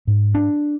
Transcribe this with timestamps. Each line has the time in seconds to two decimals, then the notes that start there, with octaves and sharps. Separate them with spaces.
0.07 G#2
0.35 D4